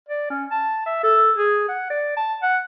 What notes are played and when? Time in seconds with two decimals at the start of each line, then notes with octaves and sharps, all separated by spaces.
0.09 D5
0.30 C#4
0.51 A5
0.86 E5
1.03 A4
1.36 G#4
1.68 F#5
1.90 D5
2.17 A5
2.42 F#5